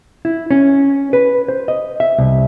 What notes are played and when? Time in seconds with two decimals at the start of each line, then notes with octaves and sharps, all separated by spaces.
0.25 E4
0.51 C#4
1.13 B4
1.48 C5
1.68 D#5
2.00 E5
2.18 C2